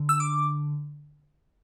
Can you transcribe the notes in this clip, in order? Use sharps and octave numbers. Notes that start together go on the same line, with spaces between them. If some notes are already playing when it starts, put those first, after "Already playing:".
Already playing: D3
E6
D6